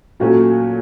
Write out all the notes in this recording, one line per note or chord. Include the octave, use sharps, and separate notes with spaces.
A#2 F#3 A3 C#4 F#4